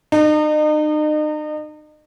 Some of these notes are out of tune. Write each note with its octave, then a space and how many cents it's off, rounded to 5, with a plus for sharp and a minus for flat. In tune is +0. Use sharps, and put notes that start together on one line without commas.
D#4 -40